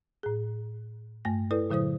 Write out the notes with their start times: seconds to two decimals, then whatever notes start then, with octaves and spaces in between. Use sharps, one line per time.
0.23 A2 G#4
1.25 G2 A3 A#6
1.51 E4 A4 B4 D5
1.70 A#2 D3 F#3 E4 C5 D#6